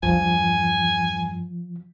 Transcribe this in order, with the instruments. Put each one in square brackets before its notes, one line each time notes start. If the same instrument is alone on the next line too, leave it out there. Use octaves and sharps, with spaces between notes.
[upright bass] E2 G2 [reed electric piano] F3 [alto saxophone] G#5